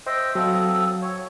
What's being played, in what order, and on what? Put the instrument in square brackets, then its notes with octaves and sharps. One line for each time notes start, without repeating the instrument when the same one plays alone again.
[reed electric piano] C5 [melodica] D#5 E5 G5
[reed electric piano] F#3 F5 [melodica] C4 A4 D#6
[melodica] C#5